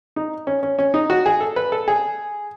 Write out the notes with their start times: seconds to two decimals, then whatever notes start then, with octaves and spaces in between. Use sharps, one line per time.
0.16 D#4
0.47 C#4
0.63 C#4
0.79 C#4
0.94 D#4
1.10 F#4
1.26 G#4
1.41 A4
1.56 B4
1.72 A4
1.88 G#4